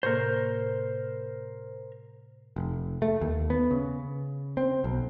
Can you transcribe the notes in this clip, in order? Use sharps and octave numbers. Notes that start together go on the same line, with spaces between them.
A2 C3 A#3 A#4 C5
F1
A3
D#2
B3
C#3
C4
B1